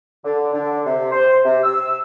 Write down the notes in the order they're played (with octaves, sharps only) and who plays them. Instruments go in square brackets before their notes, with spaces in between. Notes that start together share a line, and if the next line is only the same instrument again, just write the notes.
[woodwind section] D3
D3
C3
C5
C3
E6